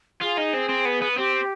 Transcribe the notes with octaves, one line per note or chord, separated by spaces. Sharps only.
F4 G#4
D#4
C4
C4
B3
B3
C4 G4